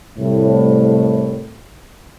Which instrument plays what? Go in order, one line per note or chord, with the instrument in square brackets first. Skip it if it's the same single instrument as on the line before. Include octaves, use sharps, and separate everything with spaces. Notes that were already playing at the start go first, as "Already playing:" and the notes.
[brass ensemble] C2 A2